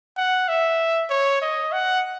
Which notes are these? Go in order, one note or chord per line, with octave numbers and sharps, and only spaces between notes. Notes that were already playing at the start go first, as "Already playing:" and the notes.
F#5
E5
C#5
D#5
F#5